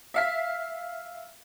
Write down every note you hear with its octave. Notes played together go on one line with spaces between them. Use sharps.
E5 F5 B6